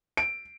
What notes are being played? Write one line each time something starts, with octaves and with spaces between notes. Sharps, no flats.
D7